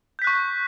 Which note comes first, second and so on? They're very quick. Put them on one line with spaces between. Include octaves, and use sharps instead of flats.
G6 B6 F#6 C#6